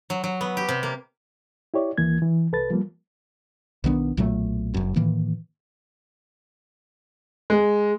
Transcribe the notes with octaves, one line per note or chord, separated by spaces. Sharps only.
F#3
F#3
B3
G4
C3
A#3
E4 G4 C#5 D5
D#2 E3 A#3 G#6
E3
C2 A4 B4 A6
F3 G3 A#3
B1 D#3 B3 D4
B1 A#2 F#3 A3
F#1 F#2
A2 D#3 E3 A#3
G#3